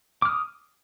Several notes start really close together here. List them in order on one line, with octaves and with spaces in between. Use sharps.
D6 F6 D#6